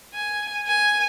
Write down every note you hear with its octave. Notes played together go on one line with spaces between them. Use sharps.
G#5
G#5